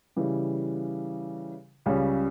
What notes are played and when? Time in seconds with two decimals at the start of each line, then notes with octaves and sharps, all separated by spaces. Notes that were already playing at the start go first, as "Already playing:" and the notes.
0.16 C#3 E3 G3
1.86 C#2 C#3 G3 C#4